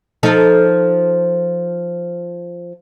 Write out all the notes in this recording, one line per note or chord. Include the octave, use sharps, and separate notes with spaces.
F3 D#4 A4